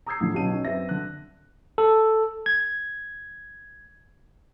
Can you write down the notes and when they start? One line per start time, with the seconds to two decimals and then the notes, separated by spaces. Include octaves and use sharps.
0.06 A#5 D#6 E6 G6 G#6 C7
0.20 A#1 A2 D3
0.34 B1 B2 C#4 D#4 D#7
0.52 C#4 D#4
0.65 F#2 C4 B4 E5 A#6
0.89 D3 F#6
1.78 A4
2.46 G#6